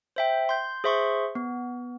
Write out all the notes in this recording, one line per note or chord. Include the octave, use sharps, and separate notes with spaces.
C5 E5 G5
C6 G6
G#4 C5 E5 C6 C#6
B3